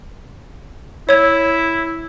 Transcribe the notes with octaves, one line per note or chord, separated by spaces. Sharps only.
E4 C#5 G#6